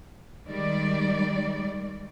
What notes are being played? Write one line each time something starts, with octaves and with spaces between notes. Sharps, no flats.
D#3 G3 G#3 D5